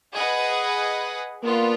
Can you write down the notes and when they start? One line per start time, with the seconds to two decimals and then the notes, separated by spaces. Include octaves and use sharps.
0.13 G#4 B4 D#5 F#5
1.44 A#3 B3 D4 F4